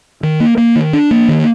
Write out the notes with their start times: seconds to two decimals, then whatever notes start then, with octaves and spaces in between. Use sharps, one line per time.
0.23 D#3
0.40 A#3
0.58 A#3
0.76 D#3
0.93 D4
1.11 A#3
1.28 D#3